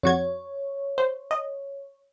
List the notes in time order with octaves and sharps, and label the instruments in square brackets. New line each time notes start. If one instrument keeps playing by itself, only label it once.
[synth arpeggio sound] F2 F#4 G#6 [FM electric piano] C#5
[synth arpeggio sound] C5
D#5